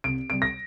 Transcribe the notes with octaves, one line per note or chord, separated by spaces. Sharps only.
C2 D7
C3 G3 D7
A#6